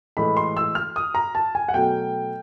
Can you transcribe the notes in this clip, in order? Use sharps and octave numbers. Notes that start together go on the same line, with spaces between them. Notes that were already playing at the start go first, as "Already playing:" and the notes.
A2 E3 G#3 B5
C6
E6
F6
D#6
A#5
A5
G#5
F#5
B2 F#3 A3 G5